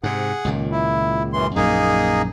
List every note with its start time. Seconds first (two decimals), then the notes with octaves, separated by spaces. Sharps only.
0.03 G#2 C3 G#4 F#5
0.45 C#2 A#2 D#3
0.72 E4
1.33 F#2 E3 C6
1.56 A#1 F#2 A#3 D#4 G#4